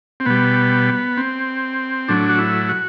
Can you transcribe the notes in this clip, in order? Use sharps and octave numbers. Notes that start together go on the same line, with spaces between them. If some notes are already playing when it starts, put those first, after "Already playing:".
C4
B2 G3 B3
C4
A2 F#3 D4
F#4
E4
F#4